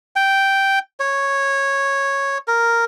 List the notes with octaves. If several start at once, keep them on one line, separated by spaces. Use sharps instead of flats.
G5
C#5
A#4